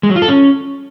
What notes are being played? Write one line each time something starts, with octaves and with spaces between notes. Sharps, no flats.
G#3
F#3
F4
A4
C#4